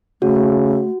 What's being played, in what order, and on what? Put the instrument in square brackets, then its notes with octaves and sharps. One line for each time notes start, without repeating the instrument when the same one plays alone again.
[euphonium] C#3 [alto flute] A3 [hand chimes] F#4